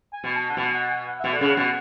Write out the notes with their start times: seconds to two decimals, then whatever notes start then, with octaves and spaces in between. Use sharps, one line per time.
0.13 G#5
0.24 B2
0.36 A5
0.50 F#5
0.57 B2 G#5
0.74 F#5
0.91 G#5
1.07 F#5
1.20 B2 E5
1.33 A4 D5 F#5
1.41 C#3
1.57 B2